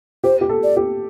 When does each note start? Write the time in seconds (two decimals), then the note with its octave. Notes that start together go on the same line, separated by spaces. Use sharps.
0.24 G4 C5
0.41 G4
0.49 A4
0.63 D5
0.77 G4